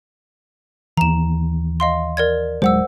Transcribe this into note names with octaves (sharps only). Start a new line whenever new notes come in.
D#2 E3 A#5 E7
D#5 F5 C6
A#4 D5 G#6
D#1 F#3 G#3 C5 F#5 E6